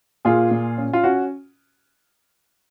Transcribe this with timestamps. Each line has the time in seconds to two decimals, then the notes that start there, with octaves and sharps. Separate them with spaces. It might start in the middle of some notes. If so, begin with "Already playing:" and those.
0.25 A#2 F4 G#4
0.51 A#2
0.78 C#4
0.93 F4
1.03 C#4 F#4